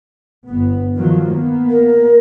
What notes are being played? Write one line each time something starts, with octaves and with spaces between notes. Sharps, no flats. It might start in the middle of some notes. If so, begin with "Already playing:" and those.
G1 B3
D#3 F3 F#3
A#3 B3
A#4